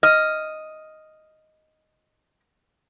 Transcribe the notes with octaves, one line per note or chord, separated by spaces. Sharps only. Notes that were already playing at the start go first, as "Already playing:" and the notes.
D#5 F6